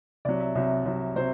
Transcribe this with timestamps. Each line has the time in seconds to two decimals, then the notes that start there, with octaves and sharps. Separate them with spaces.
0.25 C2 C3 F#3 D5
0.40 E5
0.55 C2 C3 F#3 E5
0.85 C2 C3 F#3
1.16 C3 F#3 C5